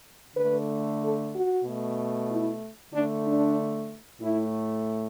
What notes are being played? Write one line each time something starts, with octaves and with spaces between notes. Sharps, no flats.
D3 A3 B4
A4
F#4
B2 A3
E4
D3 A3 D4
D4
A2 A3 E4